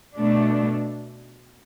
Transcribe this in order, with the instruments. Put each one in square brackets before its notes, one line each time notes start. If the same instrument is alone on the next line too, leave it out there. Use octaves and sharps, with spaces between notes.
[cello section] B2 A3 D4